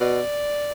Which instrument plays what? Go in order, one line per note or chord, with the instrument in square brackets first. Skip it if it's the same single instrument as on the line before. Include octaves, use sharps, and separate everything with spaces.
[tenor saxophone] B2 [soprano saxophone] D5